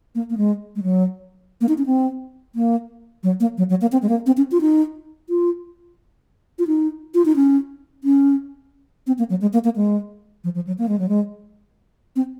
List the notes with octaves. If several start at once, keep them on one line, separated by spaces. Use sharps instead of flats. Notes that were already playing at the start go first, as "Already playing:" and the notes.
A#3
A#3
G#3
G#3
F#3
A#3
D#4
C#4
C4
A#3
F#3
A#3
F#3
F#3
A#3
C4
G#3
A#3
C4
C#4
F4
D#4
F4
F4
D#4
F4
D#4
C#4
C#4
C4
A#3
F#3
G#3
A#3
A#3
G#3
F3
F3
F#3
A#3
G#3
F#3
G#3
C4